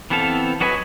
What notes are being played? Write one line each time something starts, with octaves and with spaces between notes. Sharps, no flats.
E3 B3 C4 A4 F5
F#3 F#4 B4 D#5 G#5